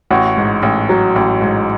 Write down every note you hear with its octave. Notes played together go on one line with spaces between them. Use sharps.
A1 F#4
G#2
A1
F#3
A1
G#2